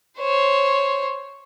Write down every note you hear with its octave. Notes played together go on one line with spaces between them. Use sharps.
C5 C#5